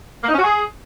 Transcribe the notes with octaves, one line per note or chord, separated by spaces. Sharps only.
A#3
D#4
C#4
F#4
G#4